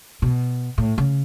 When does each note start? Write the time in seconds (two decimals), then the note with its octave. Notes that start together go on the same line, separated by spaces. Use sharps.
0.22 B2
0.78 A2
0.98 C#3